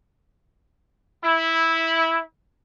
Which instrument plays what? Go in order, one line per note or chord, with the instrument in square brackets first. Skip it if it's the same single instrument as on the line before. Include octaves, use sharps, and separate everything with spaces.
[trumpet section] E4